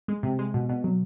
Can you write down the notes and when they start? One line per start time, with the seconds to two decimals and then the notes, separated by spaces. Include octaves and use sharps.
0.08 G#3
0.23 C3
0.39 G#3
0.54 B2
0.69 B2
0.84 F#3